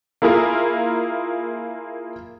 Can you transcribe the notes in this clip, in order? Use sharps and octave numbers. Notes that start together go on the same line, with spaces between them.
A#3 E4 F4 G#4 A#4